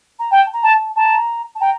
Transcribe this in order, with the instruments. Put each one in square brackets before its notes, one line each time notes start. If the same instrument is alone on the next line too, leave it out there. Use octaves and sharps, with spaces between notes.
[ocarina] A#5
[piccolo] G5 [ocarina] A5
[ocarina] A#5
[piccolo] A5
[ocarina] A5
[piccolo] A5 [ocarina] A#5
[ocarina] A5
[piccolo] G5 [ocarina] A#5